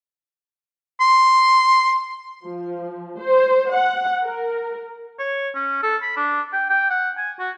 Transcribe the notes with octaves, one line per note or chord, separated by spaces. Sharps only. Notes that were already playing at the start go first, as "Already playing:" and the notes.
C6
F3
C5
F#5
A#4
C#5
C#4
A4
B5
D4
G5
G5
F#5
G#5
F#4